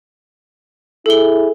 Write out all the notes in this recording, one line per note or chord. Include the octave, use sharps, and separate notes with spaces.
E4 G#4 A4 G7